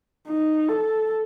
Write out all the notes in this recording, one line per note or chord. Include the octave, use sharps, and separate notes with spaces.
D#4
A4